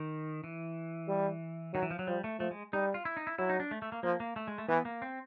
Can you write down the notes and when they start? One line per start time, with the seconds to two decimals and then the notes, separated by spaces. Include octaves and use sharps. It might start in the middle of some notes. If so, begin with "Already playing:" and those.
Already playing: D#3
0.44 E3
1.08 G3
1.74 D#3 F#3
1.82 E3
1.91 F3
1.99 F#3
2.07 F3 G3
2.24 A3
2.40 F3 A3
2.51 G#3
2.73 G3 D#4
2.94 F4
3.05 E4
3.17 D#4
3.27 E4
3.38 F#3 E4
3.49 D#4
3.60 D4
3.71 A3
3.82 A3
3.92 A#3
4.03 F3 A#3
4.20 A#3
4.36 A3
4.48 G#3
4.58 A3
4.69 E3 B3
4.85 A#3
5.02 C4